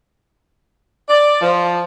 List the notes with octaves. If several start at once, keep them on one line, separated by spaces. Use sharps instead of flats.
D5
F3